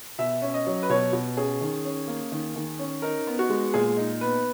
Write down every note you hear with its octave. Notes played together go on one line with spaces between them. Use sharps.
B2 E5
C#4
D#5
F#3
B4
B2 C#5
B2
C#4 G#4
D#3
C#4
A#3
D#3
D#3
C#4
D#4 A#4
B3
F#4
G#3
A#2 G#4
D#4
B3 B4